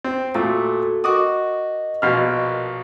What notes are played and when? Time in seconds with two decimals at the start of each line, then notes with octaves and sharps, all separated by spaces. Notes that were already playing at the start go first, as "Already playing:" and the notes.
0.04 C4
0.34 A#2 A3 F#4 A4
1.04 F#4 A#4 D#5 D6 D#6
2.02 A#1 B2 F6